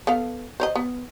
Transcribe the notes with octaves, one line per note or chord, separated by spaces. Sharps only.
B3 A4 F5
C5 C#5 D#5
B3